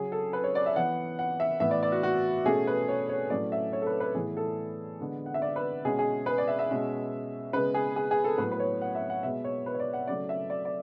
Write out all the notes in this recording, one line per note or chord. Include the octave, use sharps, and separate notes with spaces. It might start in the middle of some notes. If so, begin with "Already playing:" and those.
Already playing: C#3 F#3 C#4 G#4
A4
B4
C#5
D5
E5
E3 B3 F#5
F#5
E5
A2 E3 B3 E5
D5
D5
F#4
F#4
B2 A3 C#4 G#4
B4
C#5
C#5
A2 F#3 A3 C#4 D5
E5
C#5
A4
B4
B4
A2 E3 B3 G#4
A4
D3 G#3 B3
F#5
E5
D5
B4
B2 G#3 C#4 G#4
G#4
B4
D5
E5
E5
B2 G#3 C#4
C#3 G#3 B3 B4
G#4
G#4
G#4
A4
A2 F#3 B3 B4
B4
C#5
F#5
E5
F#5
B2 G#3 B3 E5
C#5
B4
C#5
D5
F#5
C#3 F#3 A3 D5
E5
D5
D5